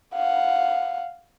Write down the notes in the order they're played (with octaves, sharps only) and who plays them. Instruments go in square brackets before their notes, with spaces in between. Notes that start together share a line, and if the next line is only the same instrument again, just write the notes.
[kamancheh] F5 F#5